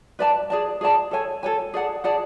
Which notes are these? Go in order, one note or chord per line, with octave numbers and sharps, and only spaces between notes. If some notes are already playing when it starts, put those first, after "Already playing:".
B4 D5 A5
G#4 D5 A5
G#4 D5 A5
A4 C#5 G#5
A4 C#5 G#5
G#4 D5 F#5 A5
G#4 D5 F#5 A5